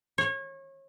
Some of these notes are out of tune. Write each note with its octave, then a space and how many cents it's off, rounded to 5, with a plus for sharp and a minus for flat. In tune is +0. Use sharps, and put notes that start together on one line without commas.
C#5 -30